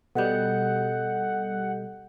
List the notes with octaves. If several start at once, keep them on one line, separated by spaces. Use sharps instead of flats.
B2 G3 A4 D#5 F#5 G6